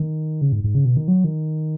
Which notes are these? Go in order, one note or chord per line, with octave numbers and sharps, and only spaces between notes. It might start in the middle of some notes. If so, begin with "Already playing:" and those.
Already playing: D#3
C#3
G#2
G#2
C#3
B2
D#3
F#3
D#3